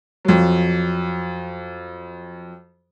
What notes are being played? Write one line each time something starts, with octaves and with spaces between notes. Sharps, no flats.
F2 F#3